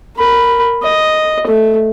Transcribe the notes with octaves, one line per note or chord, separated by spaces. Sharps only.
A#4 B5
D#5
A3